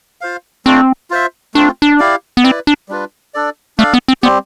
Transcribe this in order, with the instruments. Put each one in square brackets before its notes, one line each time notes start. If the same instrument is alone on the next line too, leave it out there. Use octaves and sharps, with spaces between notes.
[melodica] F4 C5 F5
[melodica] A3 D4 F4 [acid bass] C4
[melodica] F4 C5 E5
[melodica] A3 C4 F4 [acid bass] D4
[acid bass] D4
[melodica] E4 G4 D5 F5
[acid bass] B3
[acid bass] C4 [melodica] E4 B4 D5
[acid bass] D4
[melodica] G3 D4 F4 B4
D4 A4 D5
[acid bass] A3 [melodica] D4 A4 D5 F5
[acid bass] B3
C4
[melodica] G3 C4 G4 [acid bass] B3